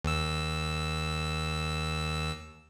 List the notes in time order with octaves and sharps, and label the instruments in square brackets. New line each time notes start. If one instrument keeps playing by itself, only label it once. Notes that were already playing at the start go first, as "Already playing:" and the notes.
[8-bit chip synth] D#2 E6